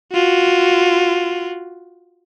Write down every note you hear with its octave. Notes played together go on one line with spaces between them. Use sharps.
F4 F#4